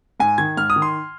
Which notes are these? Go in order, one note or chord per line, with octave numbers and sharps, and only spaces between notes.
G#2 G#5
D#3 G#6
G#2 F6
D#6
D#3
C6